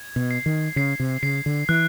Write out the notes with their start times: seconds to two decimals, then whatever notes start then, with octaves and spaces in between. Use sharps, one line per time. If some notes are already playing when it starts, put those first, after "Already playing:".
Already playing: G#6
0.16 B2
0.31 C7
0.46 D#3
0.76 C#3 C7
1.00 C3
1.23 C#3 C7
1.46 D3
1.69 E3 F#6